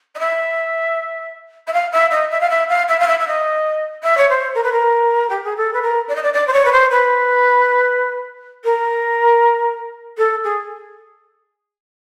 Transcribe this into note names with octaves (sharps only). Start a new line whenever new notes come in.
D#5
E5
E5
F5
E5
D#5
E5
F5
E5
F5
E5
F5
E5
E5
D#5
E5
C#5
C5
A#4
B4
A#4
G4
G#4
A4
B4
A#4
D5
D#5
D5
D5
C5
C#5
B4
C5
B4
A#4
A4
G#4